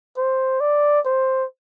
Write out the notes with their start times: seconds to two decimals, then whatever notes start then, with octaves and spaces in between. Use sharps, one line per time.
0.17 C5
0.60 D5
1.06 C5